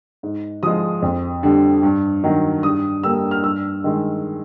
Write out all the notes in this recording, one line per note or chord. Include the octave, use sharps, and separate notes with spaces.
G#2
F3 G#3 D#6
F2
D3 G3
G2
D#3 F#3
G2 D#6
D3 G3 A#3 E6
F6
G2 E6
D#3 G#3